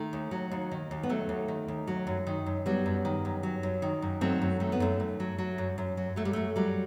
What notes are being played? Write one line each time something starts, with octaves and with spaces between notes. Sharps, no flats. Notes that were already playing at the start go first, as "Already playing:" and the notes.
Already playing: D#3 A3
D#2
F#3
D#2
D#3
D#2
B3
F#3 A3
D#2
D#3
D#2
F#3
F#2
D#3
F#2
F#3 G3 B3
F#2
D#3
F#2
F#3
F#2
D#3
F#2
F#3 A3 C4
F#2
D#3 A3
B3
F#2 A3
F#2
F#3
F#3
F#2
F#2
F#3
F#3 A3
G3
F#2 A3
F#3 G3